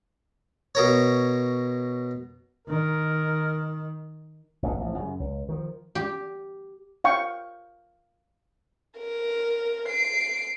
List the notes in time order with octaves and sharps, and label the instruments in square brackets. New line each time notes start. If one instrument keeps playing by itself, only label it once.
[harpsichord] B2 A#4 C#5
[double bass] D#3 [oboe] A#4
[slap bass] F1 A#1 G#2
A1 F3
F#2 C#3
C#2
D#3 F3
[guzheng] G4
[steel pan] F5 G5 C#6
[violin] A#4
C7 D7